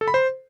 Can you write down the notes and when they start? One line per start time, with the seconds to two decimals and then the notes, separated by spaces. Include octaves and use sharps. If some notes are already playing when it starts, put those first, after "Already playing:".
0.01 A4
0.08 B5
0.14 C5